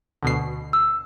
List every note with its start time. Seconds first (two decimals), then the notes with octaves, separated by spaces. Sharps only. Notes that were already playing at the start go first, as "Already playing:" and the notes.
0.23 D2 B2 C7
0.73 E6